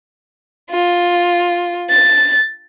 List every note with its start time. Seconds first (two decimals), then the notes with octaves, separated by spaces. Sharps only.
0.71 F4
1.91 A6